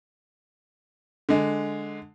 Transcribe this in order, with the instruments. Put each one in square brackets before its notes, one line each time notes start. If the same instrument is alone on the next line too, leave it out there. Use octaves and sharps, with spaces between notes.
[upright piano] D3 G#3